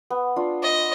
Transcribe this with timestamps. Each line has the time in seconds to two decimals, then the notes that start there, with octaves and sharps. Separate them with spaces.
0.10 B3
0.36 D4 F4
0.63 D#5